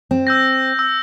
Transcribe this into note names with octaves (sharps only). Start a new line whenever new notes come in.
C4
E6 G6 A#6
E6